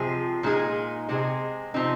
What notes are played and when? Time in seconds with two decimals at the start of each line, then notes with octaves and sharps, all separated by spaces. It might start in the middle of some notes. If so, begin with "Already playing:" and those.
Already playing: C3 F3 G#3 C4 G#4
0.43 A#2 F3 G#3 D#4 G#4
1.09 C3 G#3 C4 G#4
1.74 C3 F3 C4 D#4